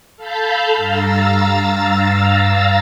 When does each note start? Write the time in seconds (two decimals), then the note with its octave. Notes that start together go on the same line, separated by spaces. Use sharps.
0.16 A4 F5 A5 B5 F6 G6
0.76 G2 F5 A#5 E6 A6